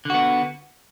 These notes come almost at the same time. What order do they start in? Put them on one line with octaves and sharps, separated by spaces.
D3 F#4 B3